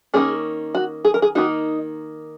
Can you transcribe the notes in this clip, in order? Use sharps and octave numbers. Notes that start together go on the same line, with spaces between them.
D#3 A#3 C#4 G#4
F#4
G#4
A#4
G#4
D#3 A#3 D#4 F#4